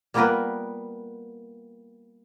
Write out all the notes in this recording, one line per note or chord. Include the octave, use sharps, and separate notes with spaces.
G3 A#3 B3 F4 A#4 B4